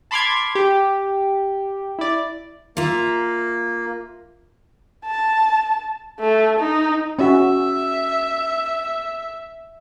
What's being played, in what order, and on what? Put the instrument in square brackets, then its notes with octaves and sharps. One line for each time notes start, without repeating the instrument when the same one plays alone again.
[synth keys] A5 B5 C6 D6 F6 G#6
G4
E4 D5
[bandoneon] A#3 [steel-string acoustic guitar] F4 E5 A#5
[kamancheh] A5
A3
D#4
[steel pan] C#4 F#4 [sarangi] E5